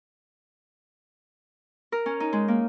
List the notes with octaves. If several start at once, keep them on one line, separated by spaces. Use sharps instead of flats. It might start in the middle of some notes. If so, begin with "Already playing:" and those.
A#4
C#4
D#4
G#3
A#3